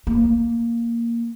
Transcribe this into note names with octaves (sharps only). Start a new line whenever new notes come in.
A#3